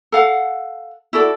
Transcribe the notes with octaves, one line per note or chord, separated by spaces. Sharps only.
A4 F5 F#5
E4 F#4 A4 D5